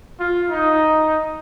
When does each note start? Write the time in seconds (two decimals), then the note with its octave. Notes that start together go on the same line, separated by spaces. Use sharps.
0.20 F4
0.50 D#4